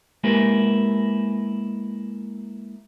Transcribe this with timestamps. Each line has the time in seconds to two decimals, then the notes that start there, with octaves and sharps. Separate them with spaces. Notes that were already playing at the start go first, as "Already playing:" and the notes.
0.24 G#3 A#3 E4 G4 A#4 B4